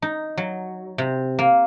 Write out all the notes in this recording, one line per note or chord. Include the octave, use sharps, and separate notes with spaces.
D#4
F#3
C3
A#3